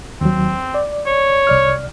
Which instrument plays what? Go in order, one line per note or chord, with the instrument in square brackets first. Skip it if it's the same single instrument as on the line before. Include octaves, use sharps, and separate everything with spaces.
[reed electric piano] D#2 F#3 [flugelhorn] C4
[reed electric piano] D5
[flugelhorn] C#5
[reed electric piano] C2 D5 F6